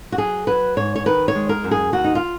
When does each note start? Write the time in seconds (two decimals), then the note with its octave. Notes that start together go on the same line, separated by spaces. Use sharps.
0.12 F#4
0.18 F#3 G#4
0.47 F#3 B4
0.76 G#2 C#5
0.96 C#5
1.06 D#3 B4
1.28 C#5
1.35 G#3
1.49 A#4
1.64 F#2
1.71 G#4
1.93 D#2 F#4
2.04 D#4
2.15 F4